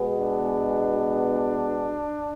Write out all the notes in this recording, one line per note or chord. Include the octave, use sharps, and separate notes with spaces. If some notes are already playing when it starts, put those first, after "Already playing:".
Already playing: B2 G#3 B3
D4